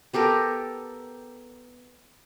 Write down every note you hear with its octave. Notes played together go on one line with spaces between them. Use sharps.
B3 G4 A4 A#4